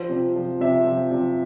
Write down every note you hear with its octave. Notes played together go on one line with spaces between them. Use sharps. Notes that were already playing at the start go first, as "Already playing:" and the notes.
Already playing: F3 C5
C3
F3
C3 E5
F3
C3